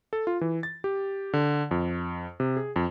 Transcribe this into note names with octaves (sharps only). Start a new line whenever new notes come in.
A4
F4
E3
A6
G4
D3
F2
C3
G#4
F2